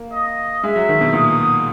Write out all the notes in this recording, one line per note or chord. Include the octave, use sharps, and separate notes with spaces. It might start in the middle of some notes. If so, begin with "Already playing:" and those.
Already playing: A#3
D#5
G#3 E5
F#3
D#3
B2
A#2 D#6